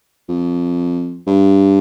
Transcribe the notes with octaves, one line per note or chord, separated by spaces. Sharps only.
F2
G2